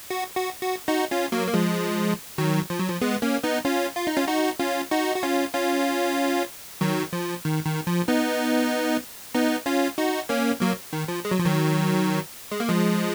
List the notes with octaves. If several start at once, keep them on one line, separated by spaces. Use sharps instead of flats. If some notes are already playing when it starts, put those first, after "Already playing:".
F#4
F#4
F#4
D#4 F#4
C#4 F4
F#3 A#3
A#3
F3 G#3
D#3 F#3
F3
F#3
F3
G#3 B3
A#3 C#4
B3 D#4
C#4 F4
F4
D#4
C#4 F4
D#4 F#4
C#4 F4
D#4 F#4
F#4
C#4 F4
C#4 F4
D#3 F#3
F3
D#3
D#3
F3
B3 D#4
B3 D#4
C#4 F4
D#4 F#4
A#3 C#4
F#3 A#3
D#3
F3
G#3
F#3
F3
D#3 F#3
G#3
A#3
F3 G#3